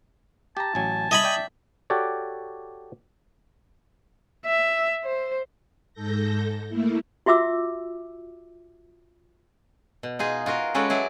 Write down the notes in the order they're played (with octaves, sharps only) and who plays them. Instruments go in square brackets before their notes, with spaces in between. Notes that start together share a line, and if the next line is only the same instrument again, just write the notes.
[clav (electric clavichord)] G4 A#5 [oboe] A5
[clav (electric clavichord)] A1 F#3 [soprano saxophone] G#5
[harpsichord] D#5 G#5 B5 [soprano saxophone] E5
[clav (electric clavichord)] D5 G5
F#4 G4 A4 C#5 D5
[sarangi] E5
C5
[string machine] G#2 A4 G6 A#6
A3 A#3 E4
[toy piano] F4 F#4 E5 D6 E6
[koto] B2
D#4 F4 G#4
F4 F#4 A#4 D#5
G#3 C#4 F#4 A4 B4 D5
F#3 E4 G#4 D5